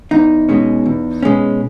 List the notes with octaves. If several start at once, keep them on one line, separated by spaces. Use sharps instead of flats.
E2 D#4
B2 G#3 C#4
E2
B2 G#3 C#4